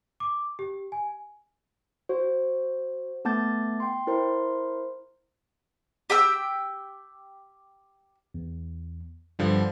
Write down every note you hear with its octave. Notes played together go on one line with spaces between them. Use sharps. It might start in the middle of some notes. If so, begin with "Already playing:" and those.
D6
G4
G#5
F#4 C5
A3 B3 A5 D6 G6 A6
G5 C6
E4 A#4 C5 C6
G4 G5 E6
E2
G2 D3 F3 G3